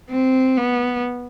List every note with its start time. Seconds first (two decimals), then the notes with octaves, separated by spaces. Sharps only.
0.10 C4
0.57 B3